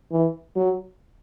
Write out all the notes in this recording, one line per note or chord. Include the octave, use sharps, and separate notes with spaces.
E3
F#3